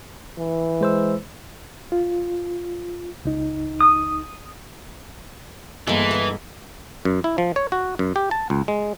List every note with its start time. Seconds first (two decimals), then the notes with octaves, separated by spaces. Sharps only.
0.38 E3
0.81 G#3 C5 E6
1.92 F4
3.25 C#2 D#4
3.81 D#6
5.87 G1 E3 G#3 A#3
6.11 D#5 E5
7.05 F#2
7.24 E4
7.38 F3
7.56 C#5
7.72 F#4
7.99 F#2
8.16 G4
8.31 A5
8.50 C#2
8.68 G#3